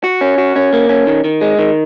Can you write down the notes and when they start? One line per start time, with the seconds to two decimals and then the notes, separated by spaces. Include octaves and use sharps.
0.04 F#4
0.21 C#4
0.38 F#4
0.56 C#4
0.73 A#3
0.89 C#4
1.07 D#3
1.24 D#3
1.41 G#3
1.59 D#3